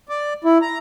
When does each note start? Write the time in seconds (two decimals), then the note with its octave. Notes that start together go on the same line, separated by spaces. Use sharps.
0.09 D5
0.44 E4
0.62 A#5